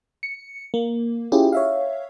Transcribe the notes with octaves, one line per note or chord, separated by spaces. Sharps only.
C#7
A#3
C#4 E4 F4 G4 G#4
C#5 E5 F5